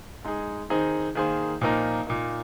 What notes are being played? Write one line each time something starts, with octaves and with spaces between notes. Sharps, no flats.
G#3 D#4 G#4
D#3 C4 D#4 G#4
D#3 A#3 G#4 C5
A#2 F3 A#3 D#4 A#4
A#2 A#3 D#4